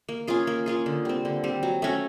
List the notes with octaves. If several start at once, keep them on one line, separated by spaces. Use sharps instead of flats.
A#3
C#4 F4 G#4
A#3
C#4 F4 G#4
D3
G3 C4
D3
G3 C4
F#3
A3 C#4 F#4